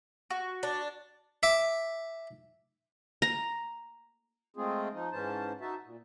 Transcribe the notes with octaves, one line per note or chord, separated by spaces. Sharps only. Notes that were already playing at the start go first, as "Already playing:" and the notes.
F#4
D4
E5 D6
A#5
G#3 A3 C4 F4 G#4
F3 D#4
G#2 E3 C#4 C5 A5
D#4 F#4 E5 A5
A#2